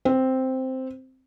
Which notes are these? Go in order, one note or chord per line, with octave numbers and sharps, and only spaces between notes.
C4